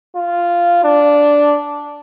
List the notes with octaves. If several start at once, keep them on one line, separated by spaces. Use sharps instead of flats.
F4
D4